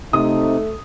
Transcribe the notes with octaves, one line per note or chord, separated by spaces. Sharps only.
C3 A3 D#4 D#6